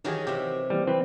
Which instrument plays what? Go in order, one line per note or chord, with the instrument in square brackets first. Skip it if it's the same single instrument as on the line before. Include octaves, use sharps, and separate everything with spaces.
[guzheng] D#3 E3 F#3 [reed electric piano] D#4 G4 G#4
[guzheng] C3 E5 [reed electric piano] G4
[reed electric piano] E3 A#3 B3 [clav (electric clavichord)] G3
[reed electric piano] E3 B4 [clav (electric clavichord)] C4